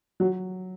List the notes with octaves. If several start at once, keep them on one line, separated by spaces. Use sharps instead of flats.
F#3